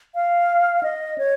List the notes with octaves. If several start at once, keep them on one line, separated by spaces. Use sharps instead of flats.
F5
D#5
C#5